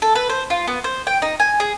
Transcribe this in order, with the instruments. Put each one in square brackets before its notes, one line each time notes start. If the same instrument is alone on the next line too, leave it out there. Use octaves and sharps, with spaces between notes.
[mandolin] A4
B4
C5
F4
B3
C5
G5
D#4
G#5
G#4